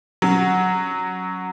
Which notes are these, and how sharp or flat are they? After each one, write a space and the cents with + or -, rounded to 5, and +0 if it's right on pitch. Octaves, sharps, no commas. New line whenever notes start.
F#3 +0 C#4 +0